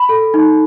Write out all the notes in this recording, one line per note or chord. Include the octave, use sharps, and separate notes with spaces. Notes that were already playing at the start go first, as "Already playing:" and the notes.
Already playing: B5
A4
D#4